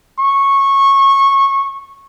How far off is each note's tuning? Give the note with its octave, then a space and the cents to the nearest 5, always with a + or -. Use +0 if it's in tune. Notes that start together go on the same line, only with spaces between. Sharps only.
C#6 -15